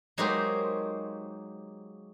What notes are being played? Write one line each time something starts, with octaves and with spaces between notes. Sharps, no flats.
F#3 G#3 A#3 D#4 G4 C5